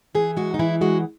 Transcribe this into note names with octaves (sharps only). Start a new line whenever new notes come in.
E3 G#4
G#3 F#4
D#4
E3 E4
G#3 F#4